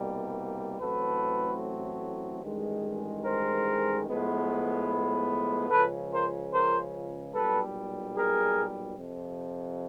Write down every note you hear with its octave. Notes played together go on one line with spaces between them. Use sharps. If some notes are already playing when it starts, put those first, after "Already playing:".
Already playing: C2 B2 G3 A#3
A1 A2 F#3 A3 C4 A4 B4
A1 G2 D#3 G#3
A#4 C5
A2 F3 G#3 B3
C#2 C#3 F3 A4 B4
A#4 C5
A#4 C5
B1 A#2 G3 A4 B4
G#4 A#4
F2 C3 F3